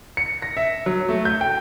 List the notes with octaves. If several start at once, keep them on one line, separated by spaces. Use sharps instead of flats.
C#7
A#6
E5
F#3
A3
G6
G5